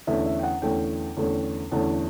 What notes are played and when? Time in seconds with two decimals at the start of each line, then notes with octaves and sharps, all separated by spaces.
0.07 E2 D3 A3 C#4 E5
0.26 E5
0.39 G5
0.43 F#5
0.62 E2 D3 A3 C#4 G5
1.17 E2 D3 A3 C#4
1.71 E2 D3 A3 C#4 A5